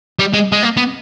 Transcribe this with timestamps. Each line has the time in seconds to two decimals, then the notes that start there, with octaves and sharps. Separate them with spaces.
0.19 G3
0.34 G#3
0.52 G#3
0.63 A#3
0.77 B3